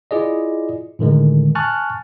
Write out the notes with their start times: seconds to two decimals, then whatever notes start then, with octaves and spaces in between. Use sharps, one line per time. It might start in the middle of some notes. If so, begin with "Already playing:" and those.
0.11 E4 F4 G#4 D5 D#5
0.99 A2 D3 D#3 G#3
1.55 G#5 A5 C#6 F6 F#6 A6